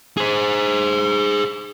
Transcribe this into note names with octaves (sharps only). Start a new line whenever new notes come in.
G#4 C5